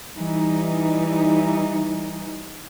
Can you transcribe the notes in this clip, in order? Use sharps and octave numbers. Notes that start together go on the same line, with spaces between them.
E3 G3 D#4